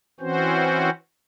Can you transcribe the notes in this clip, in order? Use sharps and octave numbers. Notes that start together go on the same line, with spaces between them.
E3 C4 C#4 F#4 C5